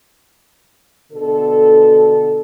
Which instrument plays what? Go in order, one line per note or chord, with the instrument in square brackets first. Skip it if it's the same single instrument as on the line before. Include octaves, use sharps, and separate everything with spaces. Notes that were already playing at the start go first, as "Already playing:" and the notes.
[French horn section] B2 D3 A4